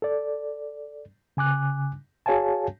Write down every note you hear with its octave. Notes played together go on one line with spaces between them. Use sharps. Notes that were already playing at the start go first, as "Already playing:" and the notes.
A4 D5
C#3 G#5 D6 F#6
F#4 G#4 C#5 F5 G#5 A5